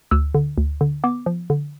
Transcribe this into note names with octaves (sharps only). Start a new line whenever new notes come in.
D2 E6
D3
D2
D3
B3 D6
F3
D3